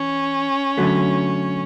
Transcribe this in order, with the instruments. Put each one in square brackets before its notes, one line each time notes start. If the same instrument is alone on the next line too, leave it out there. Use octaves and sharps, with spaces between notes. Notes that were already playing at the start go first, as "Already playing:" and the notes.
Already playing: [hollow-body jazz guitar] E3 [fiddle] C#4
[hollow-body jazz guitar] F#2 D3 F#3 A3